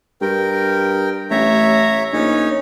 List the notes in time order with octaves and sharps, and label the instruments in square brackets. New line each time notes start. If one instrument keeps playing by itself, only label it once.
[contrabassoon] G2 [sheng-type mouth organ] A#4 G5
[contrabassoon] A1 [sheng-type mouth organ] C#5 E5 A#5
[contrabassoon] A#1 [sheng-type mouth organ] C#4 D#4 C#5